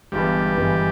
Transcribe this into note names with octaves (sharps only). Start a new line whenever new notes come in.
G1 G2 E3 G3 G#3 B3
G1 G2 E3 G#3 B3